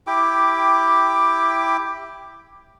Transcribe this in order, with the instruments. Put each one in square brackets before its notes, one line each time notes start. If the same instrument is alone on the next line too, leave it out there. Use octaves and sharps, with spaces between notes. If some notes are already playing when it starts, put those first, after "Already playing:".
[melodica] E4 G4 G5 D6